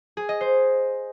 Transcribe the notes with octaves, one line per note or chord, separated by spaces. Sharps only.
G#4
D#5
C5